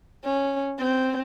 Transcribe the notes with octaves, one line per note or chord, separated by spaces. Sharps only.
C#4
C4